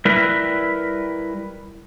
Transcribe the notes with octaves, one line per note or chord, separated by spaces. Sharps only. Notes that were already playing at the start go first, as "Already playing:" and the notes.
G3 E4 A#4 B4